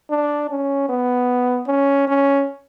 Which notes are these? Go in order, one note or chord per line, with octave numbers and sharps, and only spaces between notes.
D4
C#4
B3
C#4
C#4